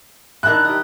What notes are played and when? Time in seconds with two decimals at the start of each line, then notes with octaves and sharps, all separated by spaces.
0.43 D#3 D4 E4 F#6
0.65 D#4 G4